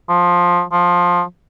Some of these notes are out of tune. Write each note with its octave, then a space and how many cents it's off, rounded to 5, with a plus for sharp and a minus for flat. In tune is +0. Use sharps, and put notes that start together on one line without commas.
F3 +10
F3 +15